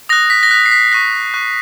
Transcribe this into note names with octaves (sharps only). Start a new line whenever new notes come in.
D#6 F#6 A#6
B6
A#6
D#6 F#6 B6
C7
B6
C#6 F#6 A#6
C#6 F#6